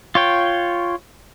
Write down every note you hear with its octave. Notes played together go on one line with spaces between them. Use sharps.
F4 C#5 G5